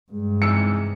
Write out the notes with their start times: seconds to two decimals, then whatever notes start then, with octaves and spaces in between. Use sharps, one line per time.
0.12 G2 G#3
0.42 E2 G#2 C3 E6 C#7